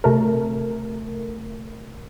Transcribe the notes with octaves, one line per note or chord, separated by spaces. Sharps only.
C3 A3 A#4